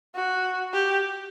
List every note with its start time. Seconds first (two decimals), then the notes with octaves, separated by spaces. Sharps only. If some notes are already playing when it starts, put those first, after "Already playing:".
0.15 F#4
0.73 G4